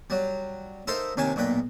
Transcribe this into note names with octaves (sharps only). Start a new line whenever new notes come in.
F#3 G3
D#4 A4 A#4 C5 E5 F5
D#2 C3 C#4 G#5 A5
B1 A#2 B4 G5